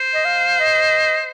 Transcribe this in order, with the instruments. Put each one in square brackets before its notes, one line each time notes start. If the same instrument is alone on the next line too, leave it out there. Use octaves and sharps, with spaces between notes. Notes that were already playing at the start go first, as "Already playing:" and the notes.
Already playing: [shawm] C5
[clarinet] D#5
F5
D#5